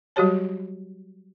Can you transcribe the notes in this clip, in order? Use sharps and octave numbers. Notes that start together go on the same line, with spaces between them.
F#3 G3 F#4 G4 C#5 A5